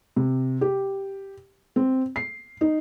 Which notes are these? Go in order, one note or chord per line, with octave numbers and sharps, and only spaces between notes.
C3
G4
C4
C7
D#4